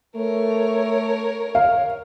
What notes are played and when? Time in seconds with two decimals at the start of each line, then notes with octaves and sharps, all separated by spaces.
0.16 A3 A#4 C#5
1.55 F5